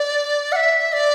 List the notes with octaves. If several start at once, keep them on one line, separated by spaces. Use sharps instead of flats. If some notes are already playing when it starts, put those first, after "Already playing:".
Already playing: D5
F#5
E5
D5